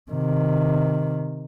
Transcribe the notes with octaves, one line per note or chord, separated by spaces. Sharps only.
C3 D#3